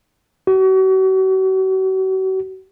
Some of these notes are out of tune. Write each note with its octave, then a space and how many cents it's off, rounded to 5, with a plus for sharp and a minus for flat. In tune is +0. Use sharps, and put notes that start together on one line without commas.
F#4 +40